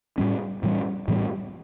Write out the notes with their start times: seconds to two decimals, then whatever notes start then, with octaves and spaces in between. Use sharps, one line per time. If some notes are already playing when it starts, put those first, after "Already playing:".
0.18 A2 G3 C#4
0.63 A2 E3 G3 C#4
1.08 A2 E3 G3 C#4